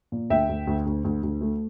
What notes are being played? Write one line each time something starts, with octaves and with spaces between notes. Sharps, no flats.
A#2
D2 E5 G5
D2
D2
D2
D2
D2
A3